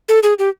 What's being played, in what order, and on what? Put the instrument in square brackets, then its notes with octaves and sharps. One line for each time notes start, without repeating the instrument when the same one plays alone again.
[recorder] A4
G#4
G4